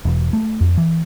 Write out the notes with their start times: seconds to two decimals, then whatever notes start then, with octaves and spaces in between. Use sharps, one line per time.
0.05 E1
0.33 A3
0.61 F2
0.78 E3